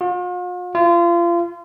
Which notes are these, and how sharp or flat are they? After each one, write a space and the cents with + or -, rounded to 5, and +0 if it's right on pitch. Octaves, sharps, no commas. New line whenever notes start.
F4 +45
F4 -30